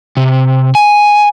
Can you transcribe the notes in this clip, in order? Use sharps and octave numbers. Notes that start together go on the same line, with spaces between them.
C3
G#5